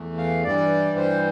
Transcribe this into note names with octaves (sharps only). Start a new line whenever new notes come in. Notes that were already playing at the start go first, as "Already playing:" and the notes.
Already playing: E2 E3 A3
F5
G2 E3 G3 D5
C5